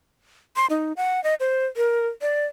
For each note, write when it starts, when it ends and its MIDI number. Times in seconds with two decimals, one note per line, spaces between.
0.56 0.66 84
0.70 0.93 63
0.97 1.22 78
1.24 1.35 75
1.40 1.66 72
1.77 2.07 70
2.22 2.46 74